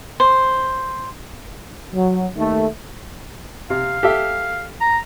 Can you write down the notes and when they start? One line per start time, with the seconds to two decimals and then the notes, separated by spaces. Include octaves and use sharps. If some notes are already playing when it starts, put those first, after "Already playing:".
0.20 C5
1.94 F#3
2.36 D#2 D#3 A3
3.70 C3 F5
4.03 G4 A4 E5
4.81 A#5